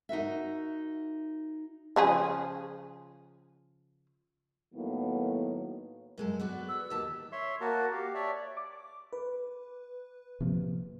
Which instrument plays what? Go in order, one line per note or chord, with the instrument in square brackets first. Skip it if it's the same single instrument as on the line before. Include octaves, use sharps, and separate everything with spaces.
[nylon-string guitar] D#4 F#4 A#4 E5
[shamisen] C#3 F3 G#4
[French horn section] A2 D#3 F#3 A#3 B3
[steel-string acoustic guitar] F#2 G#3 A4
B3 F#4 D5
[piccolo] E6
[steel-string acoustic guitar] D#2 G4 A5
[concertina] C#5 E5 C6
A#3 F#4 A#4 A5
G4 F5
C#5 D5 E5 A5
[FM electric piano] D6
B4
[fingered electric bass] C3 F3 A#3